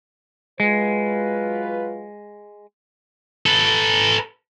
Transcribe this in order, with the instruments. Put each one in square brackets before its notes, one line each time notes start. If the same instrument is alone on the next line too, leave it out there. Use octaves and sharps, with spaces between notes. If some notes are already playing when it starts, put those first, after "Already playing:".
[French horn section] F#3 F4 B4 [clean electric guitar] G#3
[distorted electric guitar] A4 B4